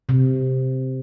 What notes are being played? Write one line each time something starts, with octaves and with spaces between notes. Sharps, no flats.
C3